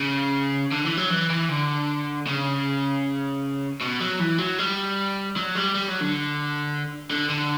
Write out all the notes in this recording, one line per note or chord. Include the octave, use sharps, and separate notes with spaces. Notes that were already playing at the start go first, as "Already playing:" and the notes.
Already playing: C#3
D3
E3
F#3
E3
E3
D3
C#3
B2
F#3
E3
F#3
G3
F#3
G3
G3
F#3
D3
D3
D3